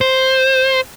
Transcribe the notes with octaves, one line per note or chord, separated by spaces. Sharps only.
C5